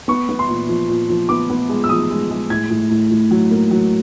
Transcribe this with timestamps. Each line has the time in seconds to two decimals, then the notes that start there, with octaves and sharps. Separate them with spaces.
0.08 B3 C#6
0.29 B3
0.39 C6
0.48 A#2
0.69 F3
0.89 A#2
1.10 F3
1.29 B3 D6
1.50 B3
1.69 G#3
1.84 E6
1.89 F3 D#6
2.11 G#3
2.31 G#3
2.50 A2 G#6
2.70 A2
2.90 A2
3.11 A2
3.31 F#3
3.51 A#3
3.71 F#3